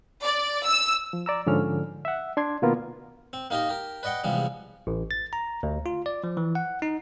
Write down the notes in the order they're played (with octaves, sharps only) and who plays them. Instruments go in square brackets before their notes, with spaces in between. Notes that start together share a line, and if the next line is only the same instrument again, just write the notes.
[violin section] D5
E6
[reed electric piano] F3
D5 A#5 E6
G#2 D3 F3 C#4 F6
E5 F#5
D4 C6 G#6
B2 D#3 A#3 B3 F4 A#4
[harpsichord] C4
A#3 D#4 G4 A#4 D#5 A#5
G4 A#4
B4 D5 D#5 F#5 G5
E2 C3 F3 G3 G#3
[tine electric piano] A1
A6
A#5
D2
F4
D5
F3
E3
F#5
D#4